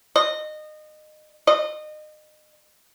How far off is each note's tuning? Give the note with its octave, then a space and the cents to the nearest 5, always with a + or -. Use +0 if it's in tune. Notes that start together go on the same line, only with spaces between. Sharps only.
D#5 -25
D#5 -30